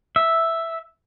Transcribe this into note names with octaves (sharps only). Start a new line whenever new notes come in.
E5